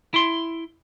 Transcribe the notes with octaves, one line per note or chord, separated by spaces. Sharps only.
E4 C6